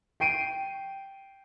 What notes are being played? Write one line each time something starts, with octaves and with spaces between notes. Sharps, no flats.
G5 C7 D7 D#7